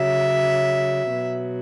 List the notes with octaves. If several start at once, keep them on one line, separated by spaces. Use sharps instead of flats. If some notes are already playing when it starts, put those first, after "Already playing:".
Already playing: C#3 F#3 E5
B2 F#3